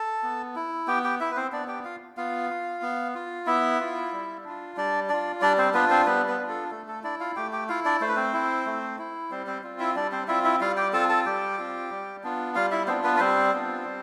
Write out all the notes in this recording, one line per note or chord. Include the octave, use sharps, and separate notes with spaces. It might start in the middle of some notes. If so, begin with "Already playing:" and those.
Already playing: A4 A5
B3
E4
B3 G4 G5
G4 G5
E4 E5
B4
C4 C5
B3 D4 D5
G4 G5
F4 F5
B3 F4 F5
F4
B3
F4
B3 E4 E5
F4
G3
D4 F4
G3 D4 D5
D4 F4 D5
G3 D4 D5
C4 C5
B3 D4 F4 B4
C4 C5
G3 B3 B4
B3 B4
D4 F4
A4
A3 A4
A4
D4 E4 D5
F4 F5
A3 G4 G5
G4 G5
E4 F4 F5
D4 D5
A3 C5
B4
C4 C5
E4
A3
E4
G3 C4 C5
C4 C5
C4 F4
E4 E5
G3 D4 D5
C4 C5
C4 E4 F4 E5
E4 E5
G3 F4 F5
G4 G5
C4 F4 A4 A5
A4 A5
G3 G4 G5
C4 F4
G3
B3 D4 F4
G3 F4 F5
E4 E5
B3 C4 D4 F4 C5
B3 B4
B4
G3 C4 C5
B3 D4 F4
G3